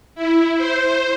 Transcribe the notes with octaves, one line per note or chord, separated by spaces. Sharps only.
E4
C5